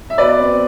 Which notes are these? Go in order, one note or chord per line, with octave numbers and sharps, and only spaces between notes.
E5
B2 B4 D5
C4